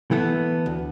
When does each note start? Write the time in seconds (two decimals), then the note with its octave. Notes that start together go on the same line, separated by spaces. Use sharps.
0.11 E3 A3 B3 A4
0.66 D2